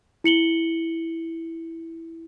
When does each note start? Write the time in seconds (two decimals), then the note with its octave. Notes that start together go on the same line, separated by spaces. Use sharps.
0.24 E4 C#7 F#7 G7